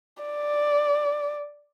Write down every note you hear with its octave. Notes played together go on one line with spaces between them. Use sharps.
D5